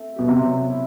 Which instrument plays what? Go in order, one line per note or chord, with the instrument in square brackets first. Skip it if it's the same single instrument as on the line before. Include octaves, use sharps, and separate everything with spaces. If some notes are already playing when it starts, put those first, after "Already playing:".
Already playing: [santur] A3 C4
[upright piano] B2 [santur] G4
[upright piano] C3
[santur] F#3
E4